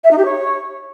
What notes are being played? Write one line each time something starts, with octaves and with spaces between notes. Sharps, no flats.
E5
D#4
G4
C#5